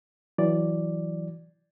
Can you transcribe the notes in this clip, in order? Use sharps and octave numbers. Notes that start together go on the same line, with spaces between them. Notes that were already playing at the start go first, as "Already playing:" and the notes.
E3 F#3 D5